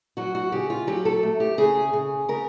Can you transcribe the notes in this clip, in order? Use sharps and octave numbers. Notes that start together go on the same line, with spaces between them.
F#3 F#4
F#4
C#3 G4
F4
F#3 G4
A4
A3
G4
C#3 G#4
C#3
C#3 A#4